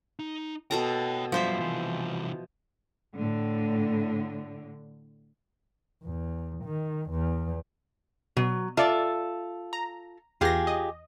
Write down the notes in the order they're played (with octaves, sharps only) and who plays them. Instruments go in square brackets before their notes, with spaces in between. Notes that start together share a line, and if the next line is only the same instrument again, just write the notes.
[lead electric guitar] D#4
[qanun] B2 A4 A#5 [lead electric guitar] C#5 G5
[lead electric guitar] F#2 G3 [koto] F3 C5 E5
[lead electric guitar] C2 E3
[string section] A2 D3
[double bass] E2
D#3
E2
[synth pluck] B2 [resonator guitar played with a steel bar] F#3
[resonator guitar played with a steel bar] F4 A4 E5 [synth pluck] D5 A5
[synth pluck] A#5
[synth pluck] E2 A#6 [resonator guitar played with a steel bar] F4 G4 G#4
[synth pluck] D#5